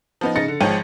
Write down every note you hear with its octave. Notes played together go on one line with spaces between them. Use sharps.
F3 B3 D#4
C#3 D#4 A6 A#6 C#7
D3
G#1 G#2 F3 C#5 G5 D#7